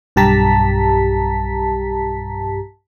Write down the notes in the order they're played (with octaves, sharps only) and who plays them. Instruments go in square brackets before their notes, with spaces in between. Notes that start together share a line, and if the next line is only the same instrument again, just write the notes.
[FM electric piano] B1 G2 G4 A5 A#5 B6